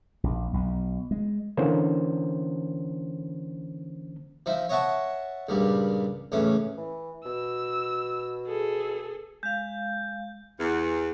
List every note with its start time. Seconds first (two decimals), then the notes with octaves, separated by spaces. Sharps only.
0.24 A#1
0.53 B1
1.11 G#3
1.57 D3 E3 A#3 C#4 C5
4.46 F3 D#4 E5
4.69 C#5 D#5 E5 F#5 A5 C#6
5.49 C#2 G2 A#2 G3
6.32 C#2 A2 E3 C#4
6.77 E3
7.26 B2 E6
8.47 G#4 A4
9.43 G#3 F5 G6
10.60 E2